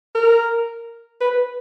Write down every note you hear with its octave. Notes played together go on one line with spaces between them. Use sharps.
A#4
B4